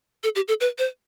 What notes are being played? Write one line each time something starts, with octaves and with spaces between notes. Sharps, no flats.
A4
G4
A4
B4
C5